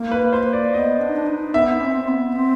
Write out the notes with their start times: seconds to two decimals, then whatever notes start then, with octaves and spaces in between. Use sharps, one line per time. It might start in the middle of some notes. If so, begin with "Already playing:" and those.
Already playing: A#3
0.11 B4
0.32 A#3 C5
0.53 D5
0.73 B3 D#5
1.00 D4
1.08 D#4
1.16 D4
1.26 D#4
1.54 B3 E5
1.81 C#4
1.85 C4
2.08 B3
2.35 C4